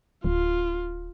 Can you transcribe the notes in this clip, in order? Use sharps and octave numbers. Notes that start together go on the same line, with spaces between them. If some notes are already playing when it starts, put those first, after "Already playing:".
D1 F4